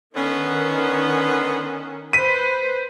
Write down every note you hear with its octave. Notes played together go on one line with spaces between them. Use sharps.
D3 D#3 B3 C#4
B4 C5 B6 D#7